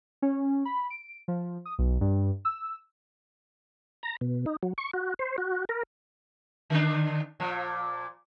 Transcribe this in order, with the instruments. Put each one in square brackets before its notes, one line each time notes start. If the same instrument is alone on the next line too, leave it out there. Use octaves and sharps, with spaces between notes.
[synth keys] C#4
B5
D7
F3
D#6
B1
G2
E6
[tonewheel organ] A#5
B2
D#4
F#3
C#6
F#4
C5
F#4
A#4
[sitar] D3 D#3 D4
A#2 F3